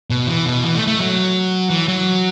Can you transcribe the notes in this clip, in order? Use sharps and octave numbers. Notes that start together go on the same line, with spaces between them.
B2
E3
B2
E3
A3
A3
F#3
E3
F#3